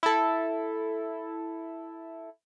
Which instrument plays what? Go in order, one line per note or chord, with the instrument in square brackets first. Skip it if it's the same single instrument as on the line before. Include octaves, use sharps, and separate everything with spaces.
[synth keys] E4 A4